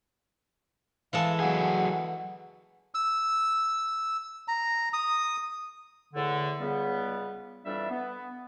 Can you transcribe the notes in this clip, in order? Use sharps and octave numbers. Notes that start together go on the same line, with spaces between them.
E3 G#3 A4 F5
F#3 G#4 F#5
E6
A#5
D#6
E2 A2 D3
C#2 C#3 G3 B3
F2 E3 G3 D4 E5
B3